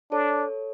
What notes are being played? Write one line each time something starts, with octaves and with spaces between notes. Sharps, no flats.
D4 A4 C#5